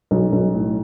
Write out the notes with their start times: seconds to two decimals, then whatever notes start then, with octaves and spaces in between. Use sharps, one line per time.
0.11 B1
0.32 B1
0.54 A2